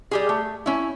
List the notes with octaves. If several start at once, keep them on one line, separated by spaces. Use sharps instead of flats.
G3 G4 G#4
A3
C#4 E4